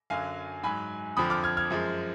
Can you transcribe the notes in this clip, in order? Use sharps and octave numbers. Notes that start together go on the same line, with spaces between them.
F#2 D3 F#3 F5 G#5
G#2 F#3 G#5 B5
F2 D3 F3 B5 D#6
D6 F6
F6 G#6
F6 G#6
F#2 F3 G#3